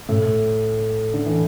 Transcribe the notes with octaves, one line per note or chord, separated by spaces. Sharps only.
A2 A3
D3
E3